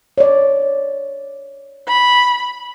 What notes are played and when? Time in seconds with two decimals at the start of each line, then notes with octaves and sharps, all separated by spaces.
0.18 C#5 D5
1.87 B5